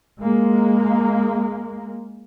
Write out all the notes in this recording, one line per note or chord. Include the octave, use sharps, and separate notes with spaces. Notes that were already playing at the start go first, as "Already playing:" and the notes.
G#3 A#3